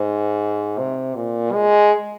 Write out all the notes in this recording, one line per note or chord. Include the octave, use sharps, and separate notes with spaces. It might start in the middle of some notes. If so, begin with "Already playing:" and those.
Already playing: G#2
C3
A#2
G#3